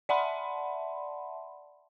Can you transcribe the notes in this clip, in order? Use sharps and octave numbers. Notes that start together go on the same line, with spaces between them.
D5 E5 F#5 A5 B5 C6